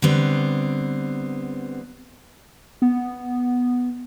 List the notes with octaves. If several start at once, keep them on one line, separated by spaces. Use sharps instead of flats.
D3 G3 B3 C4
B3